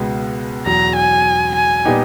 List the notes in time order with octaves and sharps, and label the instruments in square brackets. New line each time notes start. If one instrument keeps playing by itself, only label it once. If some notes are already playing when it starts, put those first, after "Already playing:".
Already playing: [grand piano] C#2 B2 G#3 B3
[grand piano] E2 B2 F#3 [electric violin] A#5
[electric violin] G#5
G#5
[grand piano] A#2 G3 B3 D#4 G4